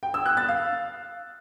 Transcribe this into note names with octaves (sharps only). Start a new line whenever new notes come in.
G5
E6
F#6
A6
F5